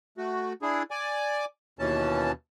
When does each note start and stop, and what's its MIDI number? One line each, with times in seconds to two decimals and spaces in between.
0.18 0.53 57
0.18 0.53 66
0.62 0.83 62
0.62 0.83 64
0.62 0.83 68
0.91 1.45 74
0.91 1.45 80
0.91 1.45 86
1.79 2.32 39
1.79 2.32 47
1.79 2.32 52
1.79 2.32 61
1.79 2.32 81